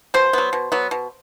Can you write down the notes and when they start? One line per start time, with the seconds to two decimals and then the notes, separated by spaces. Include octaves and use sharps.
0.14 B2 C5
0.33 F#3 B3
0.53 B2
0.72 F#3 B3
0.91 B2